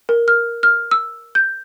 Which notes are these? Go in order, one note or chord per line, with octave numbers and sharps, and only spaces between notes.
A#4
F6
F6
E6
G6